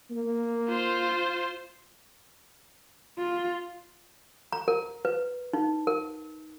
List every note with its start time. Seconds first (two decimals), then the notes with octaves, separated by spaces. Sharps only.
0.11 A#3
0.69 F4 C5
3.18 F4
4.52 A#5
4.68 A#4
5.05 B4
5.53 D#4
5.87 A#4